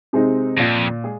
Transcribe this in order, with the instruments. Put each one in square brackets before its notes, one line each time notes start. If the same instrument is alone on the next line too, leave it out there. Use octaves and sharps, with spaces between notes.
[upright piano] C3 G#3 C4 D#4
[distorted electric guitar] F2 [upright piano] A#2
[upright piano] G#3 G#4